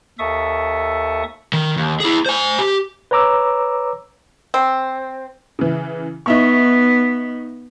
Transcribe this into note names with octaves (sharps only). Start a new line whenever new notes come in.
D#2 A4 E5 C#6 D#6
D#3
D#2
E4 G#4
C5 G#5
G4
B4 C#5 A#5 D6 E6
C4
C#3 E3
B3 D#4 E5 C#6